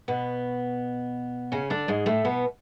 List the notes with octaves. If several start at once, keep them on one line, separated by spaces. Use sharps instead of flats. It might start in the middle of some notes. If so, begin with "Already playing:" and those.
B2 B3
C#3 C#4
D3 D4
G#2 G#3
A2 A3
B2 B3